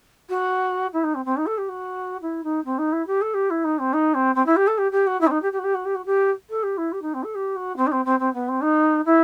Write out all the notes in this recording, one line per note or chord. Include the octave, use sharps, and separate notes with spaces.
F#4
E4
D#4
C4
C4
D#4
A4
G4
F#4
E4
D#4
C4
D#4
E4
G4
A4
G4
E4
D#4
C4
D#4
C4
C4
E4
G4
A4
G4
G4
F#4
E4
C4
D#4
G4
G4
F#4
G4
F#4
G4
F#4
G4
A4
G4
E4
G4
D#4
C4
A4
G4
F#4
C4
D#4
C4
C4
C4
B3
C4
D#4
E4